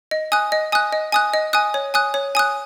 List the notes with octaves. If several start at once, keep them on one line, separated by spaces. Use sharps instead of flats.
D#5
G#5 D#6 F#6
D#5
G#5 D#6 F#6
D#5
G#5 D#6 F#6
D#5
G#5 D#6 F#6
C#5
G#5 D#6 F#6
C#5
G#5 D#6 F#6